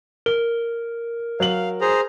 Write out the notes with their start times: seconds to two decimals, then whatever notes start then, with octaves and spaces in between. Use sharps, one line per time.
0.26 A#4 G7
1.40 F#3 F5 F#7
1.81 G#4 C5 A#5